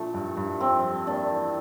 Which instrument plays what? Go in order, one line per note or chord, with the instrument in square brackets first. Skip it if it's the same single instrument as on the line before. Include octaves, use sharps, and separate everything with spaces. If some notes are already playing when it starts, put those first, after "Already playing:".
Already playing: [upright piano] A#2 F3 D4 [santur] A3
[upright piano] G2
G2
[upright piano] F2 [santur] C4
[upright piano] G3
[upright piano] A#3 [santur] D4
[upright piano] E3